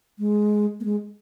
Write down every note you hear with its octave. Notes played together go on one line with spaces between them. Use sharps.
G#3
A#3
G#3